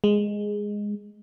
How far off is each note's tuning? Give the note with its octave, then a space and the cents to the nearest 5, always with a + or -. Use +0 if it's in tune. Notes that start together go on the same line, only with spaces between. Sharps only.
G#3 -5